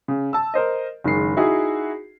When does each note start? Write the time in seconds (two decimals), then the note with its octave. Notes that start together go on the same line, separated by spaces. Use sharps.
0.08 C#3
0.33 A5 E6
0.54 A#4 C5 D#5
1.04 F#1 D#3 G#3 C7
1.37 D#4 E4 F#4 G#4